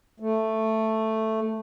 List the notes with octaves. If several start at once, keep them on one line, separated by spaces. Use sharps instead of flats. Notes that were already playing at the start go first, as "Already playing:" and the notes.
A3